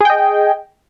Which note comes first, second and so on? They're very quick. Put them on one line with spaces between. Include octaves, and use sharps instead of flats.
G#4 G5 D#5